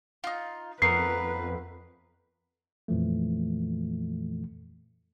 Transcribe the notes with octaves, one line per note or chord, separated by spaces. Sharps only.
D#4 F4
F2 A3 B3 A#4 B4 C7
F2 A#2 E3 F3 A3